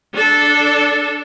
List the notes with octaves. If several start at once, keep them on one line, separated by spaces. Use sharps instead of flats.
D4 A4